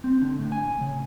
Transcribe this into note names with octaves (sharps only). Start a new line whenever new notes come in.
C4
D3
A2
G#5
C#3